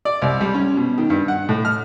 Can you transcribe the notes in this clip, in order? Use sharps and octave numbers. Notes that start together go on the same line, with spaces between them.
D5
C2
G3
C#4
B2
D#3
G2
F#5
A2
F6